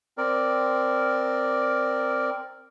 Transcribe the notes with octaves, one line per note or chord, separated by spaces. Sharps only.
C4 A#4 D5